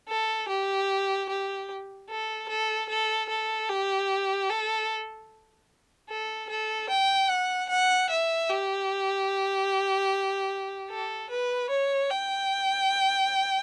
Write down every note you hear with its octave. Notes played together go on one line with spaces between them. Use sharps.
A4
G4
G4
A4
A4
A4
A4
G4
A4
A4
A4
G5
F#5
F#5
E5
G4
A4
B4
C#5
G5